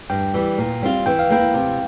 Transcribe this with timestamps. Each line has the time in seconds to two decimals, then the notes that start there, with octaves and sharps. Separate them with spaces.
0.10 G2 G5
0.34 E3 G3
0.58 A#2
0.82 G3 C4 F4
1.06 E3 G5
1.19 F5
1.30 A#3 E4 G5
1.54 C3